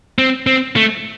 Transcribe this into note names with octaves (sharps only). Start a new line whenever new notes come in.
C4
C4
A3